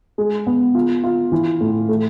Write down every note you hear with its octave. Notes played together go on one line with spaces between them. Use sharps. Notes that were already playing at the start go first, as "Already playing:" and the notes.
G#3
B3
F4
F4
E3
A2
A3